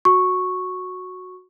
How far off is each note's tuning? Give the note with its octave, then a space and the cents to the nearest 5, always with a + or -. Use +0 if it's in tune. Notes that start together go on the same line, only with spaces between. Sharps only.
F#4 -10 C#6 -5